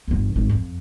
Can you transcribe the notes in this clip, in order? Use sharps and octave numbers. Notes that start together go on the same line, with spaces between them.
G1 E2
G#1
F2